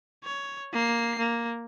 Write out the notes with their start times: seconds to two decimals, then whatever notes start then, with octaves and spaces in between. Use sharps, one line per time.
0.24 C#5
0.73 A#3 C7
1.18 A#3